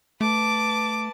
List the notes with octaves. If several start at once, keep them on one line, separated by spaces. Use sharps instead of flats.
A3 B4 A5 D6